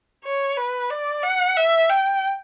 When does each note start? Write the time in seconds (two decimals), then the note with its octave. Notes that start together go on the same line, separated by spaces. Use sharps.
0.25 C#5
0.57 B4
0.90 D5
1.23 F#5
1.56 E5
1.89 G5